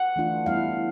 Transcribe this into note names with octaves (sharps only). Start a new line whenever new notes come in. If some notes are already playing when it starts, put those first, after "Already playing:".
Already playing: F#5
E3 A3 D4 F4
G3 B3 E4 F5